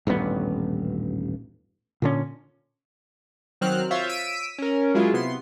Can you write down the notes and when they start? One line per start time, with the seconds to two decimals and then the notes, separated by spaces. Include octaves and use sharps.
0.07 D#1 A1 G2 B3
2.02 A#2 D3 C#4
3.61 D#3 F#3 C4 F6 F#6
3.91 F4 C5 C#5 E5 F5
4.09 E6 B6 D7 D#7
4.58 C#4 A#4
4.94 F#3 G#3 E4 F4
5.13 C3 B3 C6